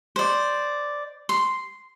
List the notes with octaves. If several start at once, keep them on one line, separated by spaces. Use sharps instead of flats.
C5 D5
C6